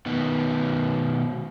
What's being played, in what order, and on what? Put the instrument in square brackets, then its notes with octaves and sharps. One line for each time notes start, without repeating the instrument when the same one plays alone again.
[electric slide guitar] B2 D#3 B3